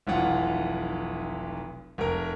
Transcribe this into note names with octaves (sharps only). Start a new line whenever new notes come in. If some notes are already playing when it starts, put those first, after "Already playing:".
F1 B1 E3 F4 F#5
F1 A#4